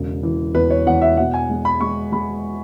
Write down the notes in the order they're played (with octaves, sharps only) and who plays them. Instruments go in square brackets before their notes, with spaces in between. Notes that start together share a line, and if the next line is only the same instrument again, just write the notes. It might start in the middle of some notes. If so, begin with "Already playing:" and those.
Already playing: [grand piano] E1 C#3
E3
E2 B4
C#5
E2 F#5
E5
B2 F#5
G#5
G#3
B5
G#3 C#6
G#3 B5